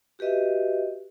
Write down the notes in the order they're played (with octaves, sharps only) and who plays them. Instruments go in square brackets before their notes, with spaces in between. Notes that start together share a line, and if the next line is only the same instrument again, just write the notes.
[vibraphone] F#4 G4 B4 D#5 E5